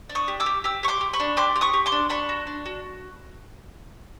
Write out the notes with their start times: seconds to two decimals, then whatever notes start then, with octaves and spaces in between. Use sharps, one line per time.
0.10 D4
0.15 C#6 D#6
0.28 G4
0.40 D6 E6
0.46 G4
0.64 G4 D6 E6
0.83 G4 C#6
0.88 C6 D6
1.01 G4
1.13 B5 C#6
1.20 D4
1.37 G4 C6 D6
1.56 G4
1.61 C#6 D#6
1.73 G4
1.86 C6 D6
1.92 D4
2.09 D4 B5 C#6
2.29 F#4
2.47 D4
2.66 F#4